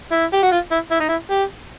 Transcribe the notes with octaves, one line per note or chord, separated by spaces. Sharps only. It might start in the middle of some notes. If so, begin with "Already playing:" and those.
E4
G4
F#4
F4
E4
E4
D#4
E4
G4